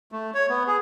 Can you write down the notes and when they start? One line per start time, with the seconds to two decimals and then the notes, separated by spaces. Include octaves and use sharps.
0.12 A3
0.34 C#5
0.50 B3
0.67 G#4